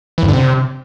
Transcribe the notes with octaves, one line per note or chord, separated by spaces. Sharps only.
E3
F2
D3
C3